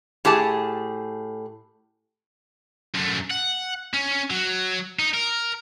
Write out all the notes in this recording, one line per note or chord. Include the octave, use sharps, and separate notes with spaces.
A2 G4 G#4 A5
F#2 A3
F#5
C#4
F#3
D#4
A#4